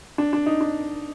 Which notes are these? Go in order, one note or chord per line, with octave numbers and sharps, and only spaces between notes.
D4
D4
D#4
D4